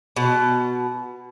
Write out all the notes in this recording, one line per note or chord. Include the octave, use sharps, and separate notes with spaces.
B2